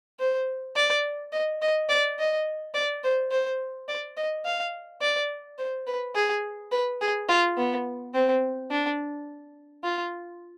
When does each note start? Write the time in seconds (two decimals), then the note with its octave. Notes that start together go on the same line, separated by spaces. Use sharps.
0.20 C5
0.76 D5
1.32 D#5
1.62 D#5
1.89 D5
2.19 D#5
2.74 D5
3.04 C5
3.31 C5
3.88 D5
4.17 D#5
4.45 F5
5.02 D5
5.58 C5
5.87 B4
6.15 G#4
6.72 B4
7.01 G#4
7.29 F4
7.57 B3
8.14 C4
8.71 D4
9.84 F4